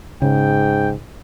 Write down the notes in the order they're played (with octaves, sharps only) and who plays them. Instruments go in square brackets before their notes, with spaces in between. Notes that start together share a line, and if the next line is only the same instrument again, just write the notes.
[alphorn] G#2 [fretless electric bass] C#3 [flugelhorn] G5